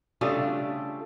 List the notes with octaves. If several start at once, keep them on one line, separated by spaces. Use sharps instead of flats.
C#3 G3 A3 D4 F4 G#4